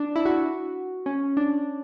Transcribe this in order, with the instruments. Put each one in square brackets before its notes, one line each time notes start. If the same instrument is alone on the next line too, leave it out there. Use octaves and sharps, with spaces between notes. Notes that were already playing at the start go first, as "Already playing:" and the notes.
Already playing: [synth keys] D4
E4
F#4
F#4
C#4
D4